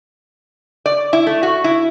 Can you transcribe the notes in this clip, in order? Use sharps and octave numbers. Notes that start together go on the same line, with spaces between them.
D5
E4
A3
F#4
E4